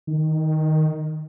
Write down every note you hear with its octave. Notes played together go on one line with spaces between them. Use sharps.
D#3